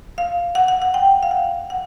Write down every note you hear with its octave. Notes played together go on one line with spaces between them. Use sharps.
F5
F#5
F#5
F#5
G5
F5
F#5
F#5